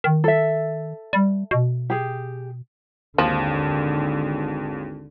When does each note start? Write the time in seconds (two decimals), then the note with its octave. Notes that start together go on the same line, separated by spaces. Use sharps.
0.04 D#3
0.24 A4 E5
1.13 G3
1.51 B2
1.90 G4 G#4
3.18 G#1 D#2 D3 F3